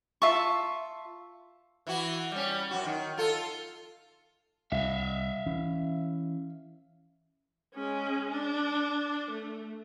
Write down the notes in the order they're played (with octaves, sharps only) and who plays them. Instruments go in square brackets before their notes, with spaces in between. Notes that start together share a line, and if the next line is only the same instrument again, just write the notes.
[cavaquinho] F4 E5 A5 C#6
[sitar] E3 E4 F#4
G3 C#4
F#2 F#4
D#3
F4 A4
[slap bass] C2 [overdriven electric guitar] E5 F5
[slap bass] E3 C#4
[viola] G#3 C#4
D4
A3